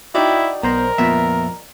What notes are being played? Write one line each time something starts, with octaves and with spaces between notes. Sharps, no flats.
D#4 E4 F#4 D5 D#5 G5
B1 B3 A#4 C5 A#5
F2 A#2 B3 E5